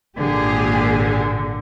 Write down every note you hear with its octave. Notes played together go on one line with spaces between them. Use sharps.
G#1 A#2 D3 G4 G#4